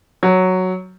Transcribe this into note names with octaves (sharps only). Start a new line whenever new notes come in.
F#3